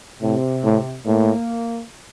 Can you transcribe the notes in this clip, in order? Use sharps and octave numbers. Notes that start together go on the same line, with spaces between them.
A2 C3
A2
A2 A#3